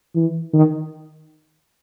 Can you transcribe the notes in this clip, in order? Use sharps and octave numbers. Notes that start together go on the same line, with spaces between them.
E3
D#3